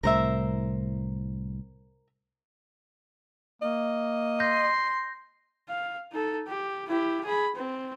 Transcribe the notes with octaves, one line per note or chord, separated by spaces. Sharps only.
C2 A2 A#4 C5 E5
A#3 D#5
C6 G6 A#6
F5
D#4 A4
G4
E4 G4
G#4 B5
C4